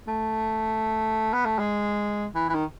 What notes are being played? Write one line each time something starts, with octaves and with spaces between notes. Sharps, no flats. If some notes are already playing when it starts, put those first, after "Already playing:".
A3
B3
A3
G#3
E3
E3
D#3